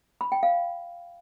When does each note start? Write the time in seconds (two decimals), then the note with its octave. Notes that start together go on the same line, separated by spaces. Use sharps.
0.21 B5
0.32 G5
0.43 F5